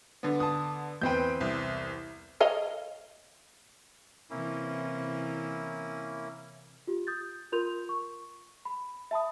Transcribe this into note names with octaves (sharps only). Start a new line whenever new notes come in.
D3 B3
A5 D#6
E2 C4 B4 G5 G6
C2
C#5 D#5 F5
C3 E3 A#3 C#4 E4
F4 G4
D#6 G6 A6
F4 A#4 C6 G6 F7
C#6
B5
E5 A5 B5 D#6